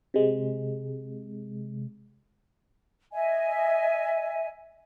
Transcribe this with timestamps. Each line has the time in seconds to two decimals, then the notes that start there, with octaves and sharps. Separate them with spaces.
0.14 C3 G#3
3.12 D#5 E5 G#5